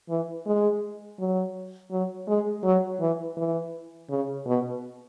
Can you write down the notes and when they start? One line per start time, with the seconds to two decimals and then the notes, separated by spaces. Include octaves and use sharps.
0.09 E3
0.46 G#3
1.19 F#3
1.91 F#3
2.28 G#3
2.64 F#3
3.00 E3
3.37 E3
4.10 C#3
4.46 B2